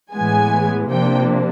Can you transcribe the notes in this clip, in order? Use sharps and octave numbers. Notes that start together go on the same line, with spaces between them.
A2 E3 G#3 B3 G#5
C3 F3 A#3 D4 G5